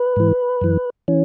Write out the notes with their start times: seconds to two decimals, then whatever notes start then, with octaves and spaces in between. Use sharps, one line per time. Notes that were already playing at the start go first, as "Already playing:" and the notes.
Already playing: B4
0.16 G#2 E3
0.61 F#2 E3
1.08 E3 C#4